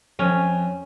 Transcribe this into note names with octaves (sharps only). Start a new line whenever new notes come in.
F2 C#4